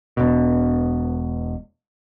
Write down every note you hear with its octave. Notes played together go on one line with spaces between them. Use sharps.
E1 B2